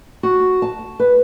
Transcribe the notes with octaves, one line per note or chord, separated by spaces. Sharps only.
F#4
A5
B4